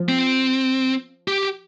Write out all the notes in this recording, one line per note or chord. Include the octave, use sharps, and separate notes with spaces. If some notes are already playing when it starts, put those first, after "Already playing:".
Already playing: F3
C4
G4